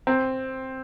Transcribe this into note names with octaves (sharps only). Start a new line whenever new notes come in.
C4